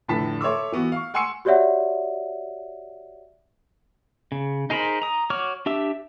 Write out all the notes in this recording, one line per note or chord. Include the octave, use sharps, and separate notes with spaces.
F1 A2 D3 A5 B6
A4 C#5 E5 C6 D6 E6
E3 B3 F#4
F5 C#6
F#5 G#5 C6 C#6 E6 C#7
F#4 G4 C#5 D5 E5 F#5
C#3
D#4 G#4 A#4 C5 B5
A#5 D#6
F#4 C#5 C#6 D6 F6
D4 G4 E5 E6